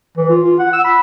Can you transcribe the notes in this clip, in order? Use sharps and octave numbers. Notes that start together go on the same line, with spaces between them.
E3
F4
F4
F#5
E6
B5